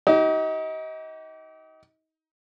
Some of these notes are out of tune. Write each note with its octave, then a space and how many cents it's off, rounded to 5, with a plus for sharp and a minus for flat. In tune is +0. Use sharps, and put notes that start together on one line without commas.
D#4 +30 G4 -35